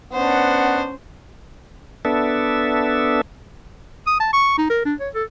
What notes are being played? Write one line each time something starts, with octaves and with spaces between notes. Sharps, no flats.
B3 C#4 D4 C5 F#5
B3 D4 A4 E5
D#6
A5
C#6
D#4
A#4
D4
C#5
A4